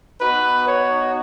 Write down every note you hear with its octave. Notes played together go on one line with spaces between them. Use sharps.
B3 D#4 F#4 B4
C#5